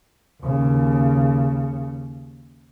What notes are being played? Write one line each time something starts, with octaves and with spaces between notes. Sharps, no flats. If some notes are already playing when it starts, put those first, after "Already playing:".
D#2 C#3